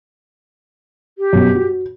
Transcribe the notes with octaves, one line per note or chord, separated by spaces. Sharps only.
G4
F#2 B2
F#4